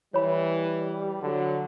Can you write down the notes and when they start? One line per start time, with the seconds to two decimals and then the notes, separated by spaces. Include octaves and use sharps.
0.14 E3 G3 C#5 B5
1.22 D3 F#3